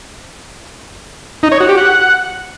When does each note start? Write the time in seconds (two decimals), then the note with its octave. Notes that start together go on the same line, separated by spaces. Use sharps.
1.43 D#4
1.52 C#5
1.60 F#4
1.69 G4
1.77 F#5